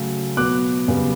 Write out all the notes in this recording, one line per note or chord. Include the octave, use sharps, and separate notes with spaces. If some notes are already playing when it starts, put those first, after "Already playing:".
Already playing: C#3 F#3 A3
B2 F#3 B3 D6 F#6
F#2 C#3 G3 B3